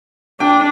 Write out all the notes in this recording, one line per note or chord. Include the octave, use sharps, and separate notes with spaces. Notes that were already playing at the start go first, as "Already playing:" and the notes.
D4 G5